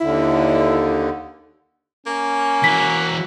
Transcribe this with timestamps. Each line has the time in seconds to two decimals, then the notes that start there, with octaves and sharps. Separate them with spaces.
0.01 D#2 D3 E4
2.07 A#3 C#4
2.64 E3 F#4 B6